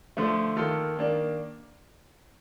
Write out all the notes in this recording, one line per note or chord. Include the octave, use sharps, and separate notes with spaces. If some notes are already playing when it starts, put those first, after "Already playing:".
D3 F3 A3
D#3 A#3 F4 A4
D#3 A#3 D4